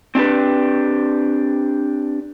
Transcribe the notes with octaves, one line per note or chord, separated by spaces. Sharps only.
C4 D4 G4 B4